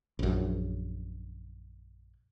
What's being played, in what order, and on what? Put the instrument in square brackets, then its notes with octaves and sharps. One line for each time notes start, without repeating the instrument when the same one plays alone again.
[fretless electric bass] A#1 F#2